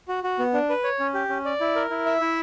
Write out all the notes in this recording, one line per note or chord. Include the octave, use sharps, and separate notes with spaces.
F#4
F#4
B3
D4
B4
C#5
C#4
G4
C#4
D5
E4
A#4
E4
E5
E4